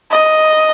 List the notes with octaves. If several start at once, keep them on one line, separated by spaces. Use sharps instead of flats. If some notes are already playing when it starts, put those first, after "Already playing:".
D#5